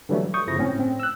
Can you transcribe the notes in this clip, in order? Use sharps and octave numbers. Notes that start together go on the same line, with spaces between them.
D3 E3 F#3 G3 A3
C#6 D#6 G6
G1 C#3 F3 E4 A#6
A2 C4 C#4
C4
E6 F#6